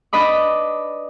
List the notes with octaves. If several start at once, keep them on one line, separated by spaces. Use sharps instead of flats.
D4 B4 D#5 B5 D6